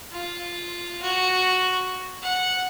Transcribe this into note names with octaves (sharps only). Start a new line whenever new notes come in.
F4
F#4
F#5